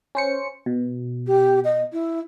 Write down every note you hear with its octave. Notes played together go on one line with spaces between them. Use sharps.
C#4 C5 C#7
B2
G4
D#5
E4